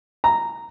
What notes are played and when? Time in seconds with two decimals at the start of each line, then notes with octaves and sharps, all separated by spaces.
0.24 A#5